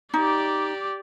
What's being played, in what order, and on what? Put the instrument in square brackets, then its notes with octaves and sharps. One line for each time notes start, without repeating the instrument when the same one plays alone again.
[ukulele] D#4 [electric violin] G4 D5